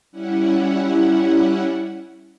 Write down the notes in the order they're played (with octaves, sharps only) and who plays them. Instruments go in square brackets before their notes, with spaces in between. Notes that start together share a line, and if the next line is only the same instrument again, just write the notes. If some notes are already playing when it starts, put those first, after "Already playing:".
[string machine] G3 C#4 E4 F#5